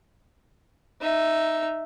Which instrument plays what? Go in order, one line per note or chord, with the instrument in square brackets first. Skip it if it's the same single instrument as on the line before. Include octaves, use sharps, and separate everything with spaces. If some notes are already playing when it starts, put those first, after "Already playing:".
[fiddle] D#4 E5